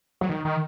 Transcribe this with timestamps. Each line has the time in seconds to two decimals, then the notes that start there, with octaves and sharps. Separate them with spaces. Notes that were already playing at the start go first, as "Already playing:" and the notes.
0.21 F#3
0.29 D#3
0.45 D#3